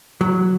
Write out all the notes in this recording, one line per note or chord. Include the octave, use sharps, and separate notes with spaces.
F#3